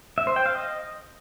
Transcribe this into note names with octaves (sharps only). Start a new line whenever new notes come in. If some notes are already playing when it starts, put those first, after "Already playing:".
E5
C5
G5
F5
D#5